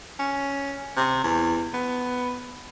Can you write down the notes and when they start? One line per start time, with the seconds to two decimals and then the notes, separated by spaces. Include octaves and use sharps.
0.19 C#4
0.97 C3
1.24 E2
1.74 B3